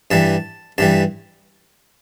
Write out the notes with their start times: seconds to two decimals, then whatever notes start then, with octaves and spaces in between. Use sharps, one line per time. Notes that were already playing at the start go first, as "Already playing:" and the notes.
0.11 G2 E3 G3 A5
0.78 G2 E3 G3 A5